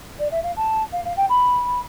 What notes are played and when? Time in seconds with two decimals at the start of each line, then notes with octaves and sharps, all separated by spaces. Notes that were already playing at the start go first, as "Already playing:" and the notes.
0.19 D5
0.31 E5
0.43 F5
0.56 A5
0.92 F5
1.05 F5
1.17 G5
1.29 B5